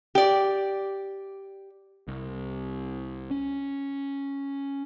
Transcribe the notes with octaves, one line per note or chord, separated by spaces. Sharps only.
G4 D5
C2
C#4